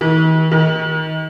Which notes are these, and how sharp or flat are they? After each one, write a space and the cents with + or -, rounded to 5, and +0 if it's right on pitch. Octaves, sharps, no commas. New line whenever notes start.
D#3 +45
D#3 +25